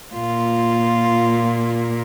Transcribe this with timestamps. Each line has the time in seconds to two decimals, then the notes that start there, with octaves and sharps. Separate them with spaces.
0.14 A#2 A#3 F4